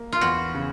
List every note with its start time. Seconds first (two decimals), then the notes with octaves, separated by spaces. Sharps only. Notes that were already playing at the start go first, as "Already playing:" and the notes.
Already playing: A#3
0.12 F4
0.21 E2 F#4
0.55 C#3